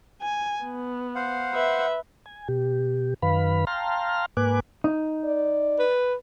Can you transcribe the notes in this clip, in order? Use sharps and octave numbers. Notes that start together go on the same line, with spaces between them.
G#5
B3
C5 F5 F#5
B4 E5
G#5
B2 G4
F#2 D#3 B4 F5 B5
F5 G5 A5 A#5 C6 F6
G#2 A#3 B4 G#5 D6 F#6
D#4
D5
B4